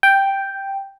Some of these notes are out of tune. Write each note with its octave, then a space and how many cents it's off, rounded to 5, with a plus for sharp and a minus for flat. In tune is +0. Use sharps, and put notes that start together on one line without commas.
G5 +0